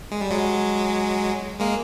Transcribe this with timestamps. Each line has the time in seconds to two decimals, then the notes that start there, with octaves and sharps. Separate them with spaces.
0.11 G#3
0.21 G3
0.31 F#3 G#3
1.60 G#3 A#3